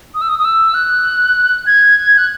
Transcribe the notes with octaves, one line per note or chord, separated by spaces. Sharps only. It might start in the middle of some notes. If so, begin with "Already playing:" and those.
D#6
E6
D#6
D#6
E6
F#6
G#6
F#6